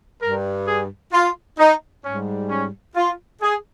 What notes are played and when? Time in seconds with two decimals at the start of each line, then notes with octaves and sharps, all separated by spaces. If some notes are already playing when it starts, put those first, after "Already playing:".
0.22 G2 G3 A#4
0.68 G#4
1.13 F4
1.59 D#4
2.05 G#2 G3 C#4
2.50 C#4
2.96 F4
3.42 G#4